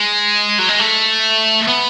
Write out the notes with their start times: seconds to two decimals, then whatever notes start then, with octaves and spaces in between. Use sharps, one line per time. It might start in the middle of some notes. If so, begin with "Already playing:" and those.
Already playing: G#3
0.59 F#3
0.69 G#3
0.80 A3
1.68 B3